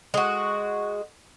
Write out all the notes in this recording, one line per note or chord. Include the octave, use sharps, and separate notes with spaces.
G#3 F#4